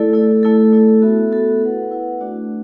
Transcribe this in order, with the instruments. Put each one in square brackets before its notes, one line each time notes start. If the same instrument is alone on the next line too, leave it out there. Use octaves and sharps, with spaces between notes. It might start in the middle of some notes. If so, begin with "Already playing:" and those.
Already playing: [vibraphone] A3 E4 A4 D5
A3 E4 A4 D5
A3 E4 A4
A3 E4 A4
B3 F#4 A4 E5
B3 F#4 A4 E5
E4 B4 F#5
E4 B4 F#5
A3 D4 F#4 D5